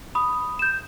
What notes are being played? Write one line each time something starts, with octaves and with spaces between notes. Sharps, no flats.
B5 D#6
G6 E7